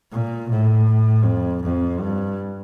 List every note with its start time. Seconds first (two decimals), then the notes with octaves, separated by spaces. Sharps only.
0.12 A#2
0.50 A2
1.25 F2
1.63 F2
2.00 G2